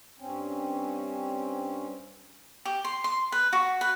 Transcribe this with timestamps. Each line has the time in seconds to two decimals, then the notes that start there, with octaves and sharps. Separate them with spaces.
0.19 G2 C4 C#4
2.65 G4
2.85 C6
3.04 C6
3.32 B4
3.53 F#4
3.81 B4